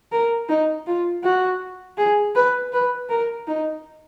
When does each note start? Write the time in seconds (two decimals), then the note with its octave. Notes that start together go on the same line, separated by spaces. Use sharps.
0.12 A#4
0.49 D#4
0.87 F4
1.24 F#4
1.98 G#4
2.35 B4
2.73 B4
3.10 A#4
3.47 D#4